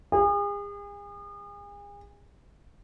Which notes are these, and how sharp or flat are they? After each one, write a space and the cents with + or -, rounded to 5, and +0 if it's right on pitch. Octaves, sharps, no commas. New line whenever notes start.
G#4 -40